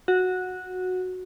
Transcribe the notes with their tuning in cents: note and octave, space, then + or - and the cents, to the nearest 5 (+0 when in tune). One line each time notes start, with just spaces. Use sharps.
F#4 -10